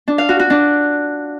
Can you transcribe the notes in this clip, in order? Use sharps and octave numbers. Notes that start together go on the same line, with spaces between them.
D4
F5
F#4
F#4
D4